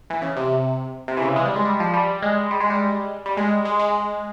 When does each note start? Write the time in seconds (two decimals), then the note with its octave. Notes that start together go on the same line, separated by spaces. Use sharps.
0.10 E3
0.22 C#3
0.36 C3
1.08 C3
1.17 E3
1.22 C#3
1.36 G#3
1.46 G3
1.56 G#3
1.65 G3
1.80 F3
1.94 G3
2.22 G#3
2.51 G3
2.60 G#3
2.70 G3
3.26 G3
3.37 G#3
3.65 G#3
3.79 G#3